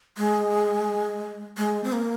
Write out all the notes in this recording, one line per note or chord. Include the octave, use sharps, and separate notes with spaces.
G#3
G#3
C4
A#3